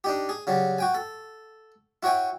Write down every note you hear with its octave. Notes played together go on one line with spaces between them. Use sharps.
D4 D#4 G4
G#4
C#3 F#3 G3
F#4 G5 G#5
A4
E4 F#4 C#5 G5 G#5